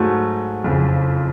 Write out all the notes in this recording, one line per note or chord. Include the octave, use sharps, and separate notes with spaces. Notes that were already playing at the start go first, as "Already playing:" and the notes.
Already playing: G#2 F#3 A3
F#1 F2 C#3